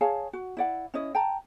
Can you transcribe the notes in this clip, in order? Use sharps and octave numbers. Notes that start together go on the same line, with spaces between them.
G#4 C#5 F5 A5
F#4
E4 D5 F#5
C#4 E4 D#5
G5 A5 A#5